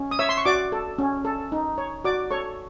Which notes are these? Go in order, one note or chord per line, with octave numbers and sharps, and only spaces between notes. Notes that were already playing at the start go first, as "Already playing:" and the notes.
Already playing: C#4
D#6
C#5 E5 E6
C6
C#6
F#4 D5 D6
A4
C#4
A4
D#4
C#5
F#4 D5 D6
A4 C#5 C#6